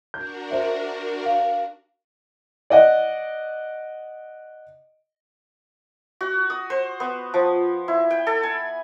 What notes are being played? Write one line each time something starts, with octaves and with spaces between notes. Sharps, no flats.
D4 F#4 A#4 G6
C5 E5
F5
D5 D#5 F#5
F#4
D#6
C5
B3
F3
E4
G5
A4
G#5